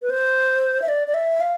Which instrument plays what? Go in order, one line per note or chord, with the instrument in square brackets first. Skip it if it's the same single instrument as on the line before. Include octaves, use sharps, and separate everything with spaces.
[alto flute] B4
C5
E5
D5
D5
E5
F5